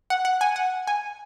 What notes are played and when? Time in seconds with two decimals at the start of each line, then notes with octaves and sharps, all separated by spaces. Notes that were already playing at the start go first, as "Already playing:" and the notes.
0.10 F#5
0.25 F#5
0.41 G#5
0.56 F#5
0.87 G#5